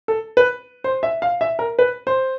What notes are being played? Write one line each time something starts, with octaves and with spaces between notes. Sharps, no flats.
A4
B4
C5
E5
F5
E5
A#4
B4
C5